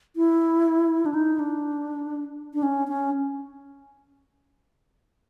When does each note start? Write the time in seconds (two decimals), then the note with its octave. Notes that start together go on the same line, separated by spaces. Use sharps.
0.16 E4
1.06 D4
1.14 D#4
1.39 D4
2.54 D4
2.63 C#4
2.88 C#4